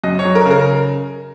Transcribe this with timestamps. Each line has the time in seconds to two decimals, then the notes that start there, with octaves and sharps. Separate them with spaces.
0.04 F#2 D#5
0.19 C#5
0.25 F#3
0.35 A#4
0.45 C#3
0.51 A#4